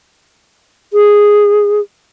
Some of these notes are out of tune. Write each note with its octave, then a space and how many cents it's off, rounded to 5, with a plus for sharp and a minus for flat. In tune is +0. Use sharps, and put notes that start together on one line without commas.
G#4 -5